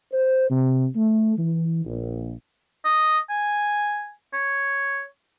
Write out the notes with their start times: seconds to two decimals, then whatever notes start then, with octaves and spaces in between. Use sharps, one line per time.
0.13 C5
0.50 C3
0.95 A3
1.37 E3
1.85 A#1
2.85 D#5
3.29 G#5
4.33 C#5